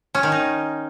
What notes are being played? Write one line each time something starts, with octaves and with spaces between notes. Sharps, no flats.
C#4
D#3
D#4